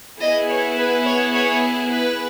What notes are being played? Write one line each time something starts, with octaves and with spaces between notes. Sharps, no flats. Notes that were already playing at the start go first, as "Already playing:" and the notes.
B3 E4 G#4 D#5
C#5
B4
C#5
C#5
B4